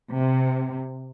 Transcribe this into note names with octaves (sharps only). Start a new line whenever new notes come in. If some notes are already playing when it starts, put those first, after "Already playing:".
C3